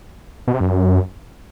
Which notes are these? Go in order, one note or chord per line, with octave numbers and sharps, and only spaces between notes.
B2
C3
F#2